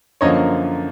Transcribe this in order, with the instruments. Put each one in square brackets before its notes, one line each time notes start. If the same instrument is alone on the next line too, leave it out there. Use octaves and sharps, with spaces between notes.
[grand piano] F#2 D3 F3 A#3 C#5 D#5